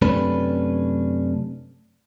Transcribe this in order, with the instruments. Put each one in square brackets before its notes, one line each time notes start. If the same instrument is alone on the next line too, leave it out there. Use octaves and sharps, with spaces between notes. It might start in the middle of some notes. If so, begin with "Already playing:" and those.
[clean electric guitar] F#2 C3 A3 C#4 D4 B4